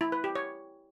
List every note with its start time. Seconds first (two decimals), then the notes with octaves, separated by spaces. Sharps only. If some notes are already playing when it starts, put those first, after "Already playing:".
0.01 E4
0.12 B4
0.24 G4
0.35 C#5